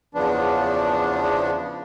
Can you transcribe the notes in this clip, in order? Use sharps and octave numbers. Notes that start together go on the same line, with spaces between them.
E2 C#3 F3 B3 D4